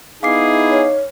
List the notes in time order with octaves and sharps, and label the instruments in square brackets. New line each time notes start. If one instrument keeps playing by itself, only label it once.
[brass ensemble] B3 E4 G#4 [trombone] D#4 [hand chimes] F5 D6 C7
[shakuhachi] C#5